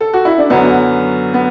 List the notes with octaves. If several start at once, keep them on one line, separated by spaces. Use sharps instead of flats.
A4
F#4
E4
D4
F#2 D3 F#3 B3
B3